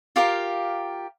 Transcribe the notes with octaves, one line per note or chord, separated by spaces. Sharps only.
F4 G4 A#4 F5